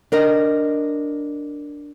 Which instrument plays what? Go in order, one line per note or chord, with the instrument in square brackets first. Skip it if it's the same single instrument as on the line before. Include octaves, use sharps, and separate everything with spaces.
[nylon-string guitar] D4 A#4 D#5